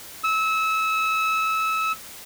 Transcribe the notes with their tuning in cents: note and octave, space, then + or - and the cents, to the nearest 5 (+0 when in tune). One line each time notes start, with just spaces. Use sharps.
E6 -25